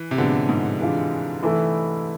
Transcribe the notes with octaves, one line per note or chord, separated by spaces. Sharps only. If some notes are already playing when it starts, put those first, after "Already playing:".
Already playing: E3
C3
A2 D3 F3 G#3 B3
G#2
E3 G#3 D4 F4
E3 A3 E4